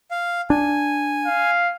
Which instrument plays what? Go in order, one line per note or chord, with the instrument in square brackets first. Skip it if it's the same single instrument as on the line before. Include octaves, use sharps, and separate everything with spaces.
[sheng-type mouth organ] F5
[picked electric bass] D4 [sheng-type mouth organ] G#5
[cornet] F5